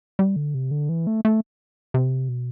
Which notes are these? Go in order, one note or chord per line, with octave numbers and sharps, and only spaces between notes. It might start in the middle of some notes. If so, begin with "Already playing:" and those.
G3
D3
C3
D3
E3
A3
A3
C3
B2